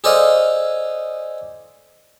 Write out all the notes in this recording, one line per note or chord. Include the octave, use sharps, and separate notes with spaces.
G#4 A4 C5 D5 D#5 F5